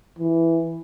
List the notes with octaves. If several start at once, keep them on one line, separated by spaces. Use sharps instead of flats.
E3